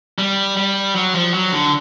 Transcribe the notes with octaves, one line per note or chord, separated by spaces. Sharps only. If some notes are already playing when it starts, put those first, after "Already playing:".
G3
G3
F#3
F3
F#3
D3